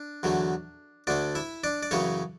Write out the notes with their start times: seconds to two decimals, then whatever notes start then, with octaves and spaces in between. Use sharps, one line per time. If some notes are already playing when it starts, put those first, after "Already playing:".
Already playing: D4
0.23 E2 D3 F#3 A3
1.07 D2 D3 A3 D4 D5
1.35 E4 E5
1.64 D4 D5
1.83 D5
1.91 F#2 C#3 E3 A3 C#4 C#5